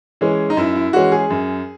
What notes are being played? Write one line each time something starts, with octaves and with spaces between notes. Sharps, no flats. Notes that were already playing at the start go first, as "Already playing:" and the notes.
E3 G#3 C#4
D#4
F#2 E4
E4
E3 G#3 C#4 F#4
G#4
F#2